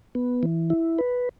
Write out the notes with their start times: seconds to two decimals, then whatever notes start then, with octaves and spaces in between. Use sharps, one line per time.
0.15 B3
0.43 E3
0.70 E4
0.98 B4